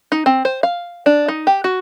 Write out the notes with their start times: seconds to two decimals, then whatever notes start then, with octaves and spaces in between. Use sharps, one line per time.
0.12 D#4
0.26 C4
0.45 C5
0.63 F5
1.06 D4
1.28 D#4
1.47 G4
1.64 F#4